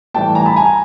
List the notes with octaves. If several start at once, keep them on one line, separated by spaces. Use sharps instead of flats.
A2 E3 G3 G5 A5
G#5 A#5
A5 B5
G#5 A#5